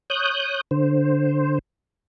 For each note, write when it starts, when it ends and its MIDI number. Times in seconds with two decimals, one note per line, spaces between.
0.10 0.61 73
0.10 0.61 87
0.10 0.61 90
0.10 0.61 91
0.71 1.59 50
0.71 1.59 72